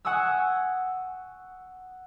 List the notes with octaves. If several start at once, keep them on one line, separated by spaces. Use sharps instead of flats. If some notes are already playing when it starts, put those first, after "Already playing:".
F#5 G#5 C#6 D#6 E6